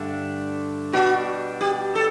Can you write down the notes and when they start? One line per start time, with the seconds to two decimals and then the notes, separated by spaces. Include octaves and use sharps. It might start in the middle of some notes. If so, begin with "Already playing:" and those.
Already playing: G2 D3 A3 D4
0.93 B2 G3 D4 F#4
1.61 G4
1.95 A4